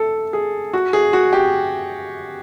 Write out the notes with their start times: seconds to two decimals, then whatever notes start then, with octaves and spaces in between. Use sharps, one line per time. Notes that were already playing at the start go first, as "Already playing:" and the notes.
Already playing: A4
0.33 G#4
0.73 F#4
0.93 G#4
1.13 F#4
1.33 G4